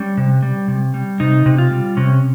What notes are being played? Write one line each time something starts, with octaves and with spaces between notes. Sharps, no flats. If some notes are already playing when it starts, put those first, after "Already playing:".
Already playing: G3 C#4
C3
G3
C3
G3
C3 D#4
C3
F4
G3
C3 C#4